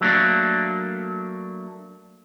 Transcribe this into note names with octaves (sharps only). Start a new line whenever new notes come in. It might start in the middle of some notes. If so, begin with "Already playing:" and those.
F#3 A3 A#3 D4